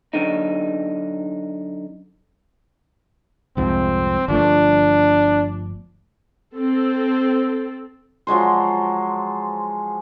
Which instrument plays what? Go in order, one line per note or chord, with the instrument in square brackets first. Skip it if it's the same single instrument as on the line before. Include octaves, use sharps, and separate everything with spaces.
[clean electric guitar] F#2 D3 D#4
[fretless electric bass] C2 F2 G#2 [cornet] C4
[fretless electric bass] G1 F3 A3 [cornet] D4
[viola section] C4 A4
[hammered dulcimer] F3 F#3 G#3 C5